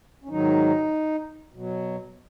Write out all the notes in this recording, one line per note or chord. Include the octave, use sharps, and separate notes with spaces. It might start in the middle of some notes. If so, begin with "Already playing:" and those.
C#4
G#2 D#3 F#3 D#4
B2 F#3